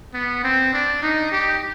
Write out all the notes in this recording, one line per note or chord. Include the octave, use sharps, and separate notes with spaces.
B3
C4
D4
D#4
G4